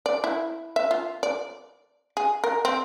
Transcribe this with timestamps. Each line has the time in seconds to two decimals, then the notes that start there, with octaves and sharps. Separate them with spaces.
0.06 D5
0.24 E4
0.76 E5
0.91 F4
1.23 D5
2.17 G#4
2.44 A#4
2.65 C4